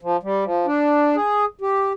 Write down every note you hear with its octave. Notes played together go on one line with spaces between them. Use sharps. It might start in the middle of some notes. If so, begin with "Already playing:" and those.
F3
G3
F3
D4
G#4
G4